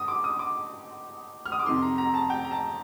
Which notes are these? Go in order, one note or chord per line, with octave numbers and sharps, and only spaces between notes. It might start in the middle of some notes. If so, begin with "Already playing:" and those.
Already playing: G2 D#6
D6
D#6
D6
F6
D#6
D6
F2 C3 D#3 C6
A#5
A#5
A5
G5
A#5
A5